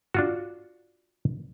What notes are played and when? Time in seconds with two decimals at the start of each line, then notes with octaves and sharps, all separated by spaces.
0.14 D4 F4 F#4